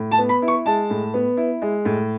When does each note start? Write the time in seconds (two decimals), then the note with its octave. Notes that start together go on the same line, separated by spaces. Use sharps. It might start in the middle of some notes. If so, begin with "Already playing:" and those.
Already playing: A2
0.11 A5
0.18 B3
0.29 B5
0.42 E4
0.48 C#6
0.66 G#3 A5
0.90 A2
1.14 B3
1.37 E4
1.62 G#3
1.85 A2